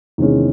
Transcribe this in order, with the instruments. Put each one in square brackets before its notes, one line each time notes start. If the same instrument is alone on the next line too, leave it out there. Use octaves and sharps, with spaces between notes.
[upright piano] E2 C3 D#3 G#3 C#4